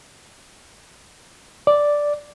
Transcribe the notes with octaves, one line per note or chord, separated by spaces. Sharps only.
D5